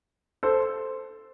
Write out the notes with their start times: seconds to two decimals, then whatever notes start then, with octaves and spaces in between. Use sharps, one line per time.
0.43 A4 C5